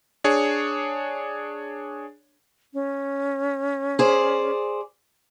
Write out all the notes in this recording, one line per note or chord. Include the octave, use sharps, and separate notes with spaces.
D4 G#4 C#5
C#4
G#4 C5 D5